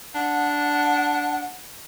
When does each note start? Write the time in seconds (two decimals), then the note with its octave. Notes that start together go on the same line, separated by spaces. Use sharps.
0.15 D4 F#5